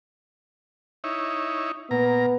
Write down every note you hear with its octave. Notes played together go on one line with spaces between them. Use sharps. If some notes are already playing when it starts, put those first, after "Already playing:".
D#4 E4 C#5
A#2 B3 A#5